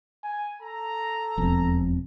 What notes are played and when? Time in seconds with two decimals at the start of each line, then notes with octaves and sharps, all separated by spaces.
0.23 G#5
0.62 A4 A#5
1.38 E1 F2